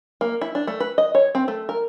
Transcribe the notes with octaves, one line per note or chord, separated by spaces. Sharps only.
A#3
E4
D4
A3
B4
D#5
C#5
C4
A3
A#4